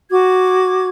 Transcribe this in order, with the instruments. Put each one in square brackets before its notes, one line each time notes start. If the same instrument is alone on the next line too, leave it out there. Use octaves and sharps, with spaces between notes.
[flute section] F#4 D6 G#6